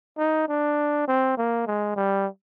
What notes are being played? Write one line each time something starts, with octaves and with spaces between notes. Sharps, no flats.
D#4
D4
C4
A#3
G#3
G3